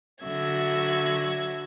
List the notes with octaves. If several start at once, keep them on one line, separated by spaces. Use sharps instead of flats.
D3 F#3 F#4 E5 G#6 A#6